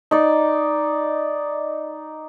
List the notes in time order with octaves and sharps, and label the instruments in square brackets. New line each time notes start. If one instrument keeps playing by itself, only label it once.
[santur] D#4 D5